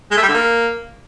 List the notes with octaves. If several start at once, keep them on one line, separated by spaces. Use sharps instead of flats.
G#3
A3
G3
D3
A#3